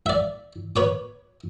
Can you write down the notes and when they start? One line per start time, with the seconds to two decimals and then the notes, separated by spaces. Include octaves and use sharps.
0.06 D5 E5
0.76 B4 C#5 D6